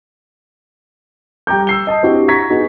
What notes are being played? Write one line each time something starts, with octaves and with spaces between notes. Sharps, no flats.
G3 G5 A#5 D6 G6
E6 C7 G7
D#5 A5 D#6
C4 D4 E4 F#4 G4
A#5 C#6 G#6 A#6 B6
B3 D#4 F#4 G#4